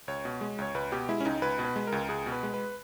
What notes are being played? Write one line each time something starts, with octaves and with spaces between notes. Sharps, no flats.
C#2 C#5
B2
G#3
C#2 C#5
C#2 B4
B2 G4
G#3 E4
C#4
C#2 D#4
C#2 B4
B2
B4
G#3
A#4
C#2
C#2 G#4
B2
B4
G#3
B4